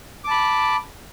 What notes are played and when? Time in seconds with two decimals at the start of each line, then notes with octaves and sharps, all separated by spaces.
0.24 D6
0.28 A5
0.31 B5